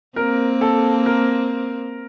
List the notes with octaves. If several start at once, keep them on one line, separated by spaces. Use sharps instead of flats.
A#3 C4 A#4
A4
A#4